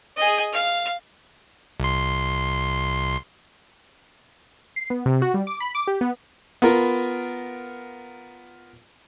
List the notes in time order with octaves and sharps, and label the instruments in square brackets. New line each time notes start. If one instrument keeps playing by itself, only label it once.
[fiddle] G#4 D#5
F5
[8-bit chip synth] C2 C6
[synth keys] C7
B3
C3
F#4
G3
D6
B5
D6
G4
B3
[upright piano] B3 F4 A#4